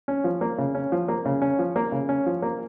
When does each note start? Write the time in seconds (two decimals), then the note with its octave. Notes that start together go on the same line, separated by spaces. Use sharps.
0.08 C#4
0.24 F3
0.41 A#3
0.58 C#3
0.75 C#4
0.92 F3
1.08 A#3
1.26 C#3
1.42 C#4
1.59 F3
1.76 A#3
1.92 C#3
2.09 C#4
2.26 F3
2.42 A#3